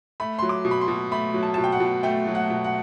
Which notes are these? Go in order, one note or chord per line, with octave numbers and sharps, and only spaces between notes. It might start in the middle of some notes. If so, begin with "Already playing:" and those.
A3 B5
F#3 C6
D6
B2
B5
C6
B2
A3 B5
F#3
A5
B2 A5
G5
F#5
B2
A3 G5
F#3
F#5
B2
F#5